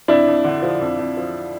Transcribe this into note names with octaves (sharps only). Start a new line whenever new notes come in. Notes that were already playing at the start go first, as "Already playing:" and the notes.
F2 D4 E4
F2
D3
F3
F2
F2
F3